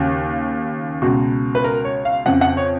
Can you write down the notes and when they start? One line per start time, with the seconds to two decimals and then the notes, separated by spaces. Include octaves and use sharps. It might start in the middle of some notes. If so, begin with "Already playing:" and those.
Already playing: D#2 C#3 F#4
1.02 C#2 B2 F#4
1.55 B4
1.64 A#4
1.85 C#5
2.05 F5
2.26 F2 C#3 F#5
2.41 F#5
2.57 C#5